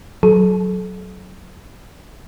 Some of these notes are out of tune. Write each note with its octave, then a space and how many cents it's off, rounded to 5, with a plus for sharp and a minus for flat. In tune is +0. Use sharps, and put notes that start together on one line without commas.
F#3 +0 A4 -35